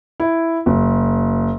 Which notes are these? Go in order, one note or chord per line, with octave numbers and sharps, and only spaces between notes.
E4
F#1